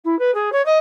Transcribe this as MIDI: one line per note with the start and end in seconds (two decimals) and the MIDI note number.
0.04 0.17 64
0.19 0.33 71
0.34 0.52 68
0.52 0.64 73
0.65 0.78 75